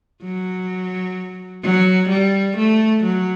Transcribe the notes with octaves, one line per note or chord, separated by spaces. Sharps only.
F#3
F#3
G3
A3
F#3